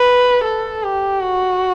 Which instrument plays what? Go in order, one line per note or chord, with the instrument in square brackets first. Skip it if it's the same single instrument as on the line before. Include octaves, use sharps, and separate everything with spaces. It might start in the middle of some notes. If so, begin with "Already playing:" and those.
Already playing: [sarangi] B4
A4
G4
F#4